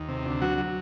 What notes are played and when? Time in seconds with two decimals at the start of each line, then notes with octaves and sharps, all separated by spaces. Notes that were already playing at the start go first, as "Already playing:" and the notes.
Already playing: D#2
0.09 C3
0.26 D2
0.42 F#3 F#4
0.58 F#3